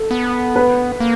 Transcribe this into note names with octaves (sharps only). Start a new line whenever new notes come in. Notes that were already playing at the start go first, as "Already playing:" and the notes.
Already playing: A4
B3
B4
A#3